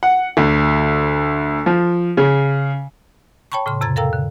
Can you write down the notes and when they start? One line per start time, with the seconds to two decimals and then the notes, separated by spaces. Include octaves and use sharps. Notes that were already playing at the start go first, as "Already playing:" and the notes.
0.03 F#5
0.37 D2
1.66 F3
2.17 C#3
3.52 C#5 G5 A5 B5 C#6
3.66 A2 C#3 C6
3.81 F2 C3 A#5 G#6 A6
3.96 A4 A#4 F5 G5 A#5 E6
4.13 D3